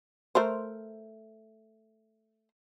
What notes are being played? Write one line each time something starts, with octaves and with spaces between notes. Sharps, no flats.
A3 A#4 C5